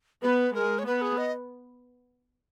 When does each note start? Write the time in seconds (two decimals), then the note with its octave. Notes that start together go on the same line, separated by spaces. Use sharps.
0.22 B3 B4
0.54 G#3 A#4
0.79 C#5
0.86 B3 B4
1.02 G#4
1.18 D#5